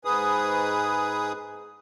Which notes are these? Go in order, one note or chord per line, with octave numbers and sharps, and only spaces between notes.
G#2 G#4 B4 D#6